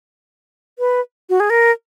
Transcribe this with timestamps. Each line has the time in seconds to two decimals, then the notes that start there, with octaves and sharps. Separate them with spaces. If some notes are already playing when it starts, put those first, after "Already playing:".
0.79 B4
1.30 F#4
1.40 G#4
1.50 A#4